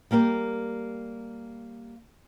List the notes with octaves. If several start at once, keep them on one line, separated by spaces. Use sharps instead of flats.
G3 A#3 G4 A#4